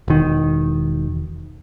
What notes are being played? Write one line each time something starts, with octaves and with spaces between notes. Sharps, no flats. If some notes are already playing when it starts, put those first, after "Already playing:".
E1 D#3